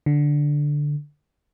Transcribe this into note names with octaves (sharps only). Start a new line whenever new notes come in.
D3